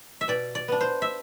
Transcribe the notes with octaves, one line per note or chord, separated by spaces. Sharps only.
E5
B2 D5
D5
B3 D4
C5
E5